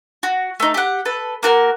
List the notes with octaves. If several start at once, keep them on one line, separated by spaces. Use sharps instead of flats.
F#4
A3 D#4
G4 F#5
A4 B4
A#3 F#4 A#4